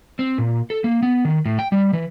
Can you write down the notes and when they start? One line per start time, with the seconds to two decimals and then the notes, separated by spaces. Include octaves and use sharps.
0.19 C4
0.38 A#2
0.70 A4
0.84 A#3
1.03 B3
1.25 D#3
1.45 A2
1.59 G5
1.72 G3
1.93 E3